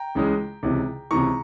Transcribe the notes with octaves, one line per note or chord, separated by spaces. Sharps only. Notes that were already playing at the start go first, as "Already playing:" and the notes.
Already playing: G5 A#5
C#2 C#3 E3 G#3
C#2 C3 E3
C#2 C3 E3 A#5 C#6